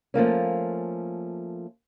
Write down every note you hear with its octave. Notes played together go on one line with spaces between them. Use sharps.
F3 A3 A#3 C#4